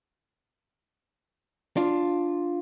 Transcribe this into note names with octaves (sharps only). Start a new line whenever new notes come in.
D4 F4